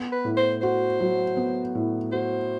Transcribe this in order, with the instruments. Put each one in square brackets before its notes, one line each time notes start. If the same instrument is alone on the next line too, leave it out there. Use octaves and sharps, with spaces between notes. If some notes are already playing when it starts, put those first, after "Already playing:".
Already playing: [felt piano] B3
[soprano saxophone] B4
[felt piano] A2
[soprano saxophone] C5
[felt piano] F#4 [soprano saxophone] C5
[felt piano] F#3
B3
A2
[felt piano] F#4 [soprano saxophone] C5